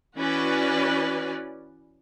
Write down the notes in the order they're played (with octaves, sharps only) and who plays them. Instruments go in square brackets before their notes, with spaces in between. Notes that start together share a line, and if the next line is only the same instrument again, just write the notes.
[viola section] E3 C#4 F#4 B4 D5